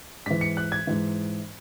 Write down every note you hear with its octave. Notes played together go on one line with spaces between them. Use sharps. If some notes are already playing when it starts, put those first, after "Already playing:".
G#2 E3 B6
C#7
F#6
G#6
G#2 E3